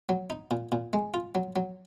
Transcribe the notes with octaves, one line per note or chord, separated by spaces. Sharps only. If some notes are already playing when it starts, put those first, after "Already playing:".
F#3
D#4
A#2
A#2
G#3
F4
F#3
F#3